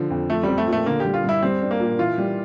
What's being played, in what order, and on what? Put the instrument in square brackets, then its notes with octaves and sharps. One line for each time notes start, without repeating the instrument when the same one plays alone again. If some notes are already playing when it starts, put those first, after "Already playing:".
Already playing: [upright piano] D3 F3
F2
[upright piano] F3 [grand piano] A3
[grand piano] G3 [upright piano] C4
[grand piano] A3
[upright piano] A#2
[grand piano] A3
[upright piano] D3 [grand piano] A#3
[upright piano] G3 [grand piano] G4
[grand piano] F4
[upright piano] G2 [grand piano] E4
[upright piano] G3 [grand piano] C4
[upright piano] D4
[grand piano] A#3
[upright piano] A#2
[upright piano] E3 [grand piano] F4
[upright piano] G3